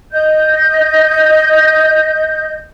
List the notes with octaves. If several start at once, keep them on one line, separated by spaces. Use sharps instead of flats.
D#5 G6